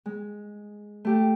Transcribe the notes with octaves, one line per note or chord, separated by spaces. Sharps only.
G#3
A3 G4